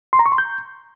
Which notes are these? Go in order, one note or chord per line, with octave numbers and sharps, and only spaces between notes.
C6
A#5
C#6
C6
G6